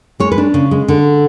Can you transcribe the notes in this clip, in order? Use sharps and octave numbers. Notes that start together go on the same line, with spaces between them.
G#3 C#5
B4
D4
C#3
G#3
D3